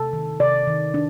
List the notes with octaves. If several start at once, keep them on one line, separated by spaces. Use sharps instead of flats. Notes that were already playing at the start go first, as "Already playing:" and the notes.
Already playing: C3 A4
D#3
C3 D5
D#3
D4